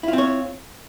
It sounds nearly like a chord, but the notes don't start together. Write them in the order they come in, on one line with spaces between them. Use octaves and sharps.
E4 F4 C4 C#5